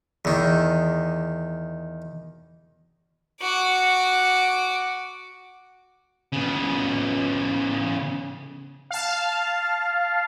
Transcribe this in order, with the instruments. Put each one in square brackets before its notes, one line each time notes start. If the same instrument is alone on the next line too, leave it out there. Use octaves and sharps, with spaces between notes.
[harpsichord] E2 D#3
[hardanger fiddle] F#4 D6
[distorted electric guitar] C#3 B3
[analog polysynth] F5 A5